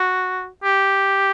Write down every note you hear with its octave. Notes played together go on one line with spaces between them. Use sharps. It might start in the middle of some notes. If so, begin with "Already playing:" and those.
Already playing: F#4
G4